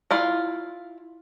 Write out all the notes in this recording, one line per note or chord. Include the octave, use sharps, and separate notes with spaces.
E4 F4 F5